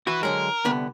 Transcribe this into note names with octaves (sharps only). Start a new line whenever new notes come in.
E4 F#4 B4
D3 F#3 G#3 A#4
C2 D3 B3